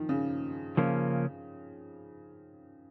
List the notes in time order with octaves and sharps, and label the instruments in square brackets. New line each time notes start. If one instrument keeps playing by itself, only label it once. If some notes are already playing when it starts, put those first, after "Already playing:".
Already playing: [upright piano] D#3 F3
C#3
[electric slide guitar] C#3 F3 A#3 C#4